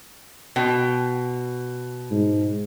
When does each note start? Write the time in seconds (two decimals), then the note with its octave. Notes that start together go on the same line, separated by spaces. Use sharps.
0.56 B2 G5
2.11 G#2